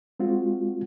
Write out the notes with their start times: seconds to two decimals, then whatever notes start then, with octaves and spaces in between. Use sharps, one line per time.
0.20 G#3 C4 F4 F#4